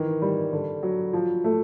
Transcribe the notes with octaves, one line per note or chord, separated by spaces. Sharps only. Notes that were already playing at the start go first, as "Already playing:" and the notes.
Already playing: D#3 E3
G3
D3
F#3
F3
A3